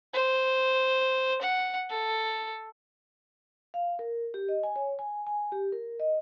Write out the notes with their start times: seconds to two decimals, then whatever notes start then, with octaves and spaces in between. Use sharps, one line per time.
0.13 C5
1.41 F#5
1.90 A4
3.74 F5
3.99 A#4
4.34 G4
4.49 D#5
4.63 G#5
4.76 C#5
4.99 G#5
5.27 G#5
5.52 G4
5.72 A#4
6.00 D#5